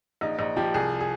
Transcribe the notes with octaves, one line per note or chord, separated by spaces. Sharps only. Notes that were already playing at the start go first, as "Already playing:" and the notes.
A#1 D#4
A#1 D#4
F3 G4
C2 G#4
G#4